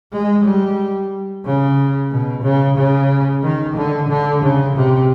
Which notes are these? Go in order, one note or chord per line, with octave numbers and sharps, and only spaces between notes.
G#3
G3
C#3
B2
C#3
C#3
D#3
D3
D3
C#3
C3